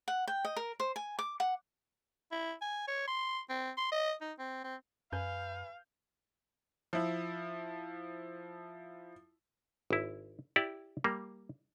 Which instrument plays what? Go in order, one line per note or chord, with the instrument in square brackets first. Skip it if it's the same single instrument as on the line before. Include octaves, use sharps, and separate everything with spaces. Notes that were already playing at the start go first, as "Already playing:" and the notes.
[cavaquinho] F#5
G5
D#5
A#4
C5
G#5
D6
F#5
[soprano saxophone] E4
G#5
C#5
C6
C4
C6
D#5
D#4
C4
C4
[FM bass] F#2 [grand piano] B4 G#5 G6 [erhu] F5
[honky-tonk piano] F3 E4
[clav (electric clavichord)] G#1 E4
E4 G4 D5
G3 A#3